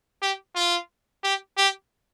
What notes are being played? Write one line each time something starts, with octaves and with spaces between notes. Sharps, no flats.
G4
F4
G4
G4